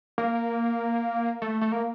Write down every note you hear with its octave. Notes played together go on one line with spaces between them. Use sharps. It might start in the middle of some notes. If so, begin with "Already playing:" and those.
A#3
A3
A3
A#3